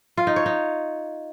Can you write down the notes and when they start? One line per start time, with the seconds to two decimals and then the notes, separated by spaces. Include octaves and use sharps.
0.17 F4
0.27 D#4
0.36 C#5
0.46 D#4